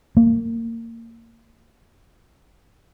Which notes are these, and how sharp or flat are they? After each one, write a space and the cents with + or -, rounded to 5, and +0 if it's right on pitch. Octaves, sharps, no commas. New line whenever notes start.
A#3 -25